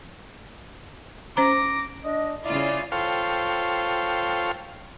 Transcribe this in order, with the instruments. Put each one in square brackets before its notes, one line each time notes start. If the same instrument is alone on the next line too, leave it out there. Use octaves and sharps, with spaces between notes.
[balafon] C#4 C5 A#5 [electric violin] D6 A#6
[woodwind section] D4 D#5
[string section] C#3 F4 [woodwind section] E4 D5
[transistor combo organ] F4 A4 C5 C#5 F5 G5